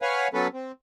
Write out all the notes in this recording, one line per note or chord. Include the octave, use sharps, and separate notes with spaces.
B4 C#5 F5 F#5 G#5
F#3 B3 C#4 A4 B4
C4